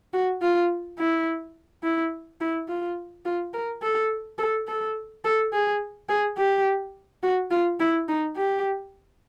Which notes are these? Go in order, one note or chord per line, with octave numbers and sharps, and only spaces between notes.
F#4
F4
E4
E4
E4
F4
F4
A#4
A4
A4
A4
A4
G#4
G#4
G4
F#4
F4
E4
D#4
G4